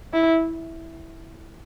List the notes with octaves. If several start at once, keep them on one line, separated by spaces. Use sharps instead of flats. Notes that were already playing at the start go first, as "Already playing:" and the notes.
E4